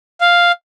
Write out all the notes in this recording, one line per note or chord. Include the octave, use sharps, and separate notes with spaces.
F5